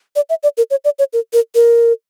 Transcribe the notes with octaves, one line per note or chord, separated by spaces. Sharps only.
D5
E5
D5
A#4
C#5
D5
C#5
A#4
A#4
A#4